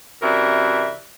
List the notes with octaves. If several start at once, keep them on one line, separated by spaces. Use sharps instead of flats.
F#2 C3 E3 A#4 D5 E5